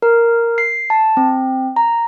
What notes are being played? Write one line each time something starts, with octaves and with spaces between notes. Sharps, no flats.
A#4
C7
A5
C4
A#5